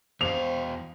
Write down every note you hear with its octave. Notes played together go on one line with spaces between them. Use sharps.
E2 C5 F5 F7